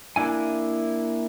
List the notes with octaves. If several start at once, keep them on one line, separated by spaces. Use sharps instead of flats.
A#3 D4 E4 G#5